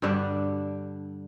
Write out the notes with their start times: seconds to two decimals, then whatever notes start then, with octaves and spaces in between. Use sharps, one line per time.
0.02 G2 D3 G3 D4